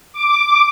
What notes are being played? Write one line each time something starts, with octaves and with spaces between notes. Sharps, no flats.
D6